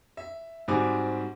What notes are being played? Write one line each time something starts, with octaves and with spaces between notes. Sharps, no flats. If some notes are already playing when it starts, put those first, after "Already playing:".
E5
G#2 G3 C4 F#4 G#5 D6